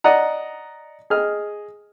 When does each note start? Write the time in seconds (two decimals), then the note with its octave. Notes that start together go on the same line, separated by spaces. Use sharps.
0.04 D5 D#5 F#5 A#5
1.10 G#4 D#5 F6